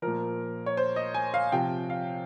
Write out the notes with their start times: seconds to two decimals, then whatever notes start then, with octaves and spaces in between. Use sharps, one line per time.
0.02 A#2 F3 A#4
0.66 C#5
0.77 C5
0.96 D#5
1.14 G#5
1.34 F5
1.52 C3 F3 G5
1.90 F5